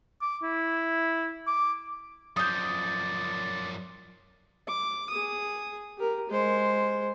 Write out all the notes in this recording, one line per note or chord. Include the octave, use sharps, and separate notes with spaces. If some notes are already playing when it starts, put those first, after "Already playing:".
D6
E4
D6
F#2 F3 D5 D#6 G6
D6
G#4 D#6
G4 A#4
G#3 C5